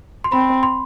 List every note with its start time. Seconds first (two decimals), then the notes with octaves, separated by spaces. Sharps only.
0.24 C6
0.32 C4 B5
0.63 C6